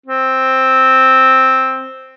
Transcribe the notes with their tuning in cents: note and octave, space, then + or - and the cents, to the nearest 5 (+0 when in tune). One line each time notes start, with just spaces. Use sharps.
C4 +5